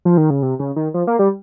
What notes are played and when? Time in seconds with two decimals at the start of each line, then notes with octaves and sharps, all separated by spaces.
0.05 F3
0.17 D#3
0.30 C#3
0.42 C3
0.60 C#3
0.76 D#3
0.94 F3
1.07 A#3
1.19 G3